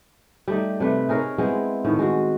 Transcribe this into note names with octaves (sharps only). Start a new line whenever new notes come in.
G3 A3 D#4
C3 A3 B4
D#4 G#4 A#4 C#5
G#3 B3 C4 E4
A2 D#3
G#3 F#4